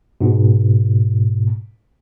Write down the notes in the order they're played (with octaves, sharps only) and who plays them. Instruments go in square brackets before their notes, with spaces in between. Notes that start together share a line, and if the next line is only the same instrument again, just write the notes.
[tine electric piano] G#2 B2